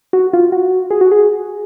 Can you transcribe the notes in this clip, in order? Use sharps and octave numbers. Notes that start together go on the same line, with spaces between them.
F#4
F4
F#4
G#4
F#4
G#4